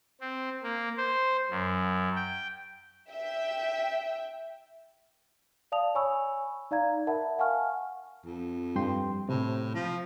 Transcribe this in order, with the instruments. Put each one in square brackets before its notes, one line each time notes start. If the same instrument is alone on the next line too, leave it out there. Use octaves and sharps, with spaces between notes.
[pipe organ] C4
A#3
C5
F#2
G5
[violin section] E5 G5
[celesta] D5 F5 A5 D#6 F7
C#5 G#5 B5 C#6 E6
D#4 D5 F5 A#5 G#6
A#4 E5 F#5 A5 B5
F5 F#5 G#5 A5 C#6 F6
[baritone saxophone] F2
[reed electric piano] G2 G5 C6
[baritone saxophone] A2 [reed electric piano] C3
[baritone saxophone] F3